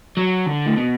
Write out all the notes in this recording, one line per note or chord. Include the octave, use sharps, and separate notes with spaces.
F#3
D3
A2
B2